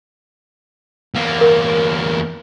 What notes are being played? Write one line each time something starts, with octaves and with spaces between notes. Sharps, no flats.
E2 A#3
A#4